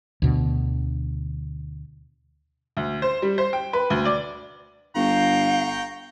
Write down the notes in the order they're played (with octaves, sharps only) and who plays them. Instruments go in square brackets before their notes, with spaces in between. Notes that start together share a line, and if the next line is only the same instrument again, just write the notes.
[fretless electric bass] D2 B2 D3
[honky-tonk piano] D2
C5
G3
C5
G5
B4
D2
D5
[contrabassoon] G1 [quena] F5 [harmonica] G5 A#5 C#6